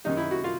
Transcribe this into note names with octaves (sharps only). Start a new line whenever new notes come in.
F#2 D#3 G3 D#4
E4
F#4
F4